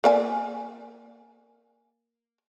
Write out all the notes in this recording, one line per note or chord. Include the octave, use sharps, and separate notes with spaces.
A#3 D5 G#5